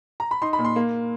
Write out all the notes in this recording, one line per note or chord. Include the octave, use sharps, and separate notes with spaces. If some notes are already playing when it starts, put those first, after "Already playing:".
A#5
B5
D#4 C6
B5
A#2
C6
A#3